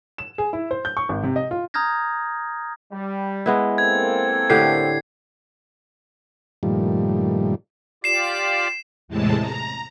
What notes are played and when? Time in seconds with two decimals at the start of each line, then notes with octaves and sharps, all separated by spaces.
0.18 E7
0.38 G#4
0.53 E4
0.71 C5
0.85 G6
0.97 C#6
1.09 G#1
1.23 C3
1.36 D#5
1.51 F4
1.74 A#5 D#6 F6 G6 G#6 A#6
2.92 G3
3.46 G#3 B3 E4
3.78 A#3 C4 A4 G#6
4.50 A2 D3 G4 C7
6.63 G2 A#2 D#3 F3 G3 A3
8.04 F4 G4 D5 C7 E7
9.08 E2 A2 C3 G#3 A5
9.40 A#5